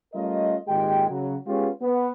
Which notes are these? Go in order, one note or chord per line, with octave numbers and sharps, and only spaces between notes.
G3 A3 C#4 F4 A#4 D#5
G#1 A#2 D#3 G#3 G4 G5
C#3 F#3
G#3 B3 C#4 F4 G4 G#4
B3